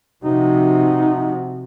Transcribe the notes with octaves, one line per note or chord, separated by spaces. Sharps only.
C3 F3 D#4 F#4